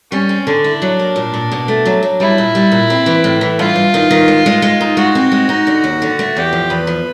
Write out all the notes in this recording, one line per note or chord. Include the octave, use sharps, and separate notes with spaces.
G3 C#4
C4
D3 D4
E4
F#3
A#3
A#2
A#2
B2
A3
F#3
F#3
G3 E4
A#2
G3
A#2
C4
E3
A2
E3
G2 F4
G2
D#3
D#3
G#3
G#3
G#3
D#4
G#3 F#4
C4
G#3
D#4
D3
D#2
D3
A3
E2 G4
F3
E2 B4
F3